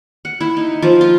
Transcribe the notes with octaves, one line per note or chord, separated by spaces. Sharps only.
F#5
E4
D#4
F3
F4